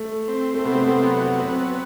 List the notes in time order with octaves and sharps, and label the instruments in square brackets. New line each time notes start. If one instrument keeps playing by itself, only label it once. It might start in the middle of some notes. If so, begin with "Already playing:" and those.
Already playing: [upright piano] A3
[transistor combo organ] C4
[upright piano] A3
[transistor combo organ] C3 [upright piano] B3
[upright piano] A3
B3
[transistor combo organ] F#3 [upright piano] B3
[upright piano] B3
[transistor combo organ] B3 [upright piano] C4